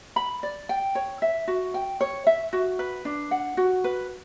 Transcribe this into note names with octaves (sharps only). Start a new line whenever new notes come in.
B5
D5
G5
C#5
E5
F#4
G5
C#5
E5
F#4
B4
D4
F#5
F#4
B4